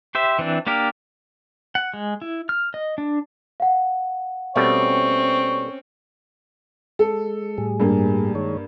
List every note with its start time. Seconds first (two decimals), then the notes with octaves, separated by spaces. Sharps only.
0.15 G4 C5 E5
0.39 E3 C4 D4
0.67 A#3 D4 G4 A#4
1.75 F#5
1.94 G#3
2.22 E4
2.49 F6
2.74 D#5
2.98 D4
3.60 F5 F#5
4.56 B2 G3 A3 C4 C#4 C#5
6.99 G#3 A4
7.58 A2 G3 G#4
7.80 G2 A#3
8.35 D#3 G#3 C#5